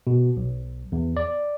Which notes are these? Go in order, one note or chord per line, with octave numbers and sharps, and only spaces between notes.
B2
B1
E2
D5